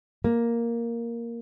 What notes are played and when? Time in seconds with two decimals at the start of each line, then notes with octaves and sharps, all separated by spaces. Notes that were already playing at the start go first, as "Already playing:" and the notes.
0.24 A#3